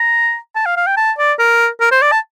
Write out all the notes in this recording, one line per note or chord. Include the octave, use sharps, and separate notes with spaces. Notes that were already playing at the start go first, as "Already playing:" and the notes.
Already playing: A#5
A5
F5
F5
G5
A5
D5
A#4
A#4
C5
D5
A5